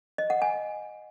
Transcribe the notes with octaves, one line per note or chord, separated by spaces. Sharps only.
D#5
F#5
G#5